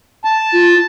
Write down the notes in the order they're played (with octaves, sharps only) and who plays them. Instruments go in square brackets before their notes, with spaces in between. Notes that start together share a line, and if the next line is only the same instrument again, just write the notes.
[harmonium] A5
[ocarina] F4